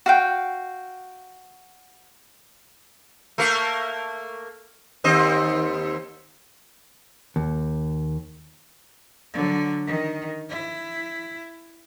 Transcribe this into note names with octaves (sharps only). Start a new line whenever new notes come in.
F#4 F5 G5
A3 A#3 A#4
D#2 C4 D#5
D#2
D3 F#3
D#3
E4